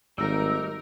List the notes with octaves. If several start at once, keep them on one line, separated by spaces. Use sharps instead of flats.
G#1 G3 A3 D#4 A#4 E6